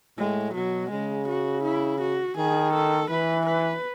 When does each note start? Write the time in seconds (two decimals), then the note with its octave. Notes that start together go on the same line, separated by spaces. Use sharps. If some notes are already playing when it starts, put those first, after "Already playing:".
0.18 A2 G#3
0.55 B2 F#3
0.91 C#3 G#3
1.28 F#4
1.64 E4
2.01 F#4
2.37 D#3 G#4
2.74 A4
3.10 E3 B4
3.47 B4